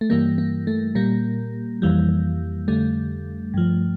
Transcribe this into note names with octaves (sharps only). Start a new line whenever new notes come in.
A3
G2 E3 G3 A#3
A#3
A3
A#2 G3 A#3
F2 E3 G3
F2 D3 G3 A3
G2 F3